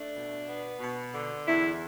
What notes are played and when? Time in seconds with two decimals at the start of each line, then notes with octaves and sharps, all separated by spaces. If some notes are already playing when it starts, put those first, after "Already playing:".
Already playing: A3 D4
0.14 B2
0.47 B3
0.80 B2
1.13 D3
1.46 E2 E4